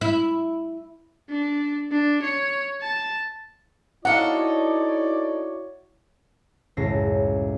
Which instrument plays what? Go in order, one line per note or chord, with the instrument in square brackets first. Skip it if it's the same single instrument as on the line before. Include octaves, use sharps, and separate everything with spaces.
[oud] E4
[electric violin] D4
D4
C#5
A5
[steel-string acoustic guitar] D#4 A4 [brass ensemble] E4 F#4 C#5 [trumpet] D5 [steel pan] F5 F#5
[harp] C#2 F#2 A2 A#6 C7